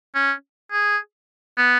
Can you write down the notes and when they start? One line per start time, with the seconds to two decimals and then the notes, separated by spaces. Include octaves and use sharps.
0.15 C#4
0.71 G#4
1.57 B3